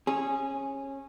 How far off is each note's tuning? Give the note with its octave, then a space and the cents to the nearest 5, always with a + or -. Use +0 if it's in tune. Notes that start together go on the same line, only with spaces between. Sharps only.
C#4 -20 G#4 +0